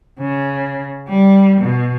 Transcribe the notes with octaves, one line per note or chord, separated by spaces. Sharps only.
C#3
G3
B2